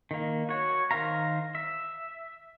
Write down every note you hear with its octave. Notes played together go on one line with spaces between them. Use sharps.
D#3 A#3
F#4 C#5
D#3 A#4 C5 F5 A#5
E5